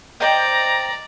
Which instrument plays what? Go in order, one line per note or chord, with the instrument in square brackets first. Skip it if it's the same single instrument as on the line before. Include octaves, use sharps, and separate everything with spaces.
[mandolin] C5 D#5 G5 [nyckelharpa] D5 [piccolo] A#5